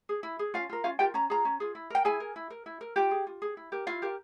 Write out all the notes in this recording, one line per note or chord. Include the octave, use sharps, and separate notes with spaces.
G#4
E4
G#4
C#4 F4 F5
F4 A#4
C#4 F4 F5
F4 G4 A#4 G5
C#4 A#5
F4 G#4 A#5
C#4
F4 G#4
E4
A#4 G5
E4 G#4 G#5
A#4
E4
A#4
E4
A#4
F4 G4 G5
G#4
F4
G#4
E4
G4 A#4
E4 F4 F5
G4 A#4